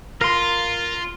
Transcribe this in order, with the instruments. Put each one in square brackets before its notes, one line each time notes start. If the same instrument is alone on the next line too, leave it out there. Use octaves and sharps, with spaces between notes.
[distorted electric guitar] F4 [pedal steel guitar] A#4 C6